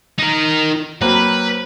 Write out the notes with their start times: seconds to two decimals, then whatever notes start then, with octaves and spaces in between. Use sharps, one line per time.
0.19 D#4 A#4
1.01 F#3 A#3 C4 B4